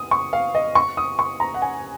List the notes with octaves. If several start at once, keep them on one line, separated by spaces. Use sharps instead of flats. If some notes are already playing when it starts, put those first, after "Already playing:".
Already playing: D#6
C#6
F5
D#5
C#6
D#6
C#6
A#5
F#5
G#5